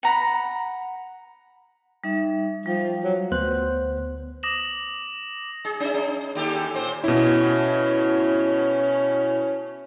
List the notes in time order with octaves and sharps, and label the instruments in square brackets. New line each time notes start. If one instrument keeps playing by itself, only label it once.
[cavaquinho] F#5 A#5 B5
[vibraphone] G3 D#4 E5
[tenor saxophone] F3 [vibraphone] G3 G5
[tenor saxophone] F#3
[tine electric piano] D2 B3 C5 F#6
[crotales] D6 D#6 A#6 E7 F#7
[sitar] G#4
C#4 E5
C#4
D#2 G4 A4
A#2 C5
[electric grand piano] B2 E4 [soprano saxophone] C#4